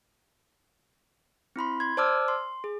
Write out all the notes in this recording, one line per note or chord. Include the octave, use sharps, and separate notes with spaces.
C4 E4 B5 C6
C6 G#6
C5 D5 A5 D6 E6 F6
C6
G#4